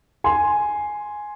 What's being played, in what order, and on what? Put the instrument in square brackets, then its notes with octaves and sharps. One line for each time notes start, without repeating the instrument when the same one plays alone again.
[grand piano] G#5 C6